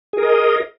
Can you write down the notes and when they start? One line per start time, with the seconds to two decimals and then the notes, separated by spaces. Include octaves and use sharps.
0.13 G#4
0.18 A#4
0.23 D#5